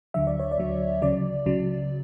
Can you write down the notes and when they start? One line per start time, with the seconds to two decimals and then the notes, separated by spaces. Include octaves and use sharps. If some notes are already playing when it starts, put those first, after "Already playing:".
0.14 D2 D3 F#3 E5
0.27 D5
0.39 C#5
0.51 D5
0.58 D2 D3 F#3
1.02 C#2 C#3 F#3 D5
1.46 C#2 C#3 F#3